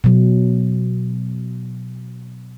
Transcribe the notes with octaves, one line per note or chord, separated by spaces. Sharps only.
B2 F#3